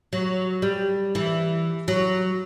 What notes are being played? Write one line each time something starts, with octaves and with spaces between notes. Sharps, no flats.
F#3
G3
E3
F#3